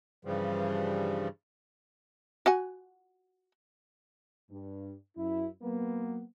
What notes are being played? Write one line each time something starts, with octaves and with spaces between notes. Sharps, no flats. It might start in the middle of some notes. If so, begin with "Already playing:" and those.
G2 C#3 E3 F3 G3
F#4 F#5 G#5
G2
F#2 E4
F#3 A#3 B3